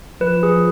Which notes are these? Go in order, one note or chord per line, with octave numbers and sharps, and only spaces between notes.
F3 B4
G#4